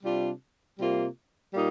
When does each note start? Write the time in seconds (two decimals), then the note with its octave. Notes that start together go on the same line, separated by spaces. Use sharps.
0.04 C3 G3 D4 F4
0.79 C3 G3 A#3 F4
1.53 A#2 G3 A#3 D#4